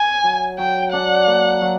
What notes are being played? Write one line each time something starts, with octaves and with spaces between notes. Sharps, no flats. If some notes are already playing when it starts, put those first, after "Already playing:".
Already playing: G#5
F#3
F#3 G5
D4 F#5
A#3
F#3